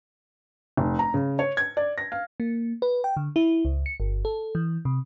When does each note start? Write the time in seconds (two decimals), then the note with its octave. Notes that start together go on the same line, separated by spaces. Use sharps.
0.77 F1
0.99 A#5
1.14 C#3
1.39 C#5
1.57 G#6
1.77 D5
1.98 A#6
2.12 F5
2.40 A#3
2.82 B4
3.04 G5
3.17 D3
3.36 E4
3.65 C#2
3.86 C#7
4.00 G1
4.25 A4
4.55 E3
4.85 C3